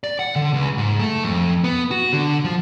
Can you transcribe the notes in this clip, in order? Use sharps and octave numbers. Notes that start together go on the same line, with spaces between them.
D5
F#5
D3
C#2
G#2
A3
F2
B3
F#4
D3
F3